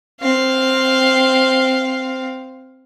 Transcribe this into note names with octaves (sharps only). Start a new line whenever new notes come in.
C4 F5